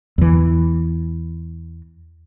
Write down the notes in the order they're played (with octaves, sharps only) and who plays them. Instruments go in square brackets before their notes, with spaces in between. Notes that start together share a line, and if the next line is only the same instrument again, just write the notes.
[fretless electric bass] E2 E3